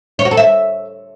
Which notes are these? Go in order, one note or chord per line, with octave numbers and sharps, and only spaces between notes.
C#5
F#4
A4
E5